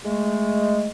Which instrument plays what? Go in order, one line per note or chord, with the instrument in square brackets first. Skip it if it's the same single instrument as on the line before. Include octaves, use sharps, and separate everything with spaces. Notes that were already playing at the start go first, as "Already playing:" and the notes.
[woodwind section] G#3 A3